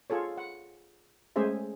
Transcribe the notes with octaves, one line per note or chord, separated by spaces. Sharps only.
F4 G#4 A4 C#5
F#5
G#3 A3 C#4 G#4 C5 E5